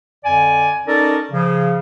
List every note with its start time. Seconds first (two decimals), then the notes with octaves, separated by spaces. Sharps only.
0.24 F2 D3 D5 G#5
0.87 C#4 D#4 A4 A#4 D5 A5
1.31 C#3 F3